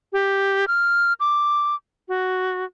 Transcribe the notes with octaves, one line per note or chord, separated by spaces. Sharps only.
G4
F6
D6
F#4